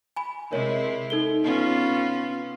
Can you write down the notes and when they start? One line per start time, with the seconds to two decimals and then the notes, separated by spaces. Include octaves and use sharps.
0.16 G#5 B5
0.52 C3 G#3 E4 A#4 C#5
1.10 D#4 A4 G7
1.42 B3 C#4 F4